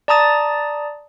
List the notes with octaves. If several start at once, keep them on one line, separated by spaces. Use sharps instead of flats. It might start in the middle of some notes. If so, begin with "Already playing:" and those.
D5 A5 A#5 D#6 A6